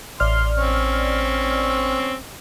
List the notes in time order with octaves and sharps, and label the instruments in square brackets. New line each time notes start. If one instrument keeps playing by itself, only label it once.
[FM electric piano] A1 D5 F6 [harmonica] C6
[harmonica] C4 C#4